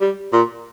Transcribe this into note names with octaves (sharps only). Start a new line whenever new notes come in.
G3
A#2